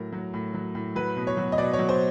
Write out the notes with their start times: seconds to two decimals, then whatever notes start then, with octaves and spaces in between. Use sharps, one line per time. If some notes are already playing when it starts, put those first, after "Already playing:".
Already playing: A2 F#3 A#4
0.13 F#3
0.34 A2
0.54 F#3
0.75 A2
0.96 F#3 B4
1.17 B2
1.27 C#5
1.37 F#3
1.52 D#5
1.58 B2 D5
1.73 C#5
1.79 F#3
1.89 C5